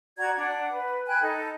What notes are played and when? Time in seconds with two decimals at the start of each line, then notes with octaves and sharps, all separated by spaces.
0.18 F#4 D5 A#5 G#6
0.36 D4 F#5
0.70 B4
1.07 G5 G#5 B5 F#6
1.21 D#4 A4